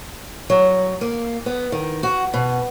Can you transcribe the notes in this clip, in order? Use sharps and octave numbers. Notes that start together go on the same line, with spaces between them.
F#3
A#3
B3
D#3
F#4
B2